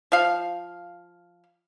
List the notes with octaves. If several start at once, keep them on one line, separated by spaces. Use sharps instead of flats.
F3 F5